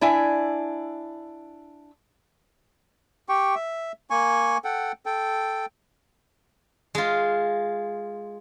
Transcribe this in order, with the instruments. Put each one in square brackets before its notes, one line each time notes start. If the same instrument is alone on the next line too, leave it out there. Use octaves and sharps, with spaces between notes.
[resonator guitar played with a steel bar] D4 E4 E5 G#5
[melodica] G4 G5 C#6
E5
A#3 G#5 C#6
A4 F#5 G5
A4 G5
[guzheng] G#3 F4